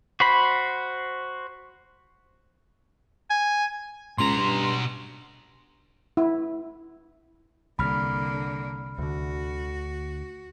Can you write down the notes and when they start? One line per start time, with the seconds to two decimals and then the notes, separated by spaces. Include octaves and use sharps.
0.20 F#4 C5 B5
3.30 G#5
4.18 C#2 B2 A#5 C6
4.37 G2
6.17 E4
7.79 C2 D3 A#3 B5 F6
8.98 D2 D3 F#4